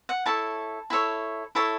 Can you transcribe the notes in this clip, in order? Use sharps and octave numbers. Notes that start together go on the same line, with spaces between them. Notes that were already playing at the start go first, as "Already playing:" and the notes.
F#5
E4 A4 C#5 A5
E4 A4 C#5
E4 A4 C#5 A5